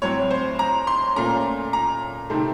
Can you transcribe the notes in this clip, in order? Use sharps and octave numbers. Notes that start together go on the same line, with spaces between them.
A2 F#3 C4 C#5
C5
A#5
C6
A#2 A3 C#4 A#5
A#5
C3 D#3 A3 C4